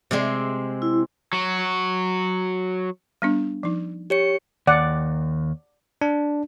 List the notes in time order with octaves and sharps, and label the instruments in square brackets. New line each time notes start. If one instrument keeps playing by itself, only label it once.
[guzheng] C3 G#3 C4
[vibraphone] E4
[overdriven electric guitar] F#3 F#4
[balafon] G3 B3 D4
F3 D#4
[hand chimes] G4 C#5 C#7
[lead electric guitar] D#2 [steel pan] D5 F#5
[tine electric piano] D4